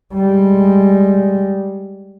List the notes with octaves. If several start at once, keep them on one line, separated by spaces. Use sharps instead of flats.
G3 G#3